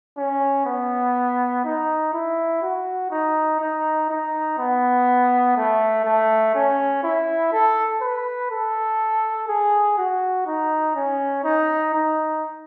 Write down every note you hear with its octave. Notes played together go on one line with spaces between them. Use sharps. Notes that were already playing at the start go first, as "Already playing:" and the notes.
C#4
B3
D#4
E4
F#4
D#4
D#4
D#4
B3
A3
A3
C#4
E4
A4
B4
A4
G#4
F#4
D#4
C#4
D#4
D#4